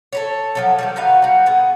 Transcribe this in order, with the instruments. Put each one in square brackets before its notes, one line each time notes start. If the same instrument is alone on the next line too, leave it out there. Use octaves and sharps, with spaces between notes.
[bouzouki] A4 B4 C#5
F3 F#3 A4
D#3 F#3 G3
D#4 F#4 B4 F5
G3 F#4
B3 G#4